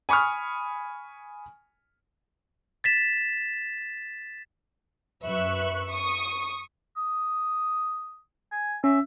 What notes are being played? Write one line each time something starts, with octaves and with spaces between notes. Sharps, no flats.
G#5 B5 C#6 D#6 F6
A6 B6 E7
F#2 B4 E5 C#6 F#6
C#6 D#6
D#6
G#5
C#4 E5